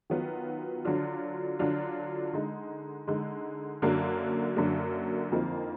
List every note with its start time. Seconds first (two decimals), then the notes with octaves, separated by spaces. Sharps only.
0.10 D#3 F#3 B3 F4
0.85 D3 F#3 D4 F4
1.59 D3 F#3 D4 F4
2.33 D3 G#3 D#4
3.07 D3 G#3 D#4
3.82 F#2 D3 F#3 A#3 D4
4.57 F#2 D3 F#3 A#3 D4
5.31 F2 D3 F3 A#3 D#4